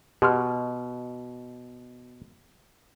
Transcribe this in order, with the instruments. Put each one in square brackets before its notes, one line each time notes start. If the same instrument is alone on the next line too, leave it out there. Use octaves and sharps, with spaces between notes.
[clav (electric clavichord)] B2 [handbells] G4 C6 F6